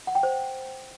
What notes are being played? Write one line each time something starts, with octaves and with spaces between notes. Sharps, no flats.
F#5
G5
C5